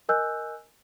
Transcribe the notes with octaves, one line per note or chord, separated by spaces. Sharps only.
A#4 D#5 G#5 E6 F#6 G6